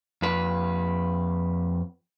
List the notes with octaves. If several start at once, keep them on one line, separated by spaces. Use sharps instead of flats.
F2 B4